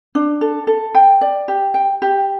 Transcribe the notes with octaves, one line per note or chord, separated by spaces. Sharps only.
D4
A4
A4
G5
D5
G4
G5
G4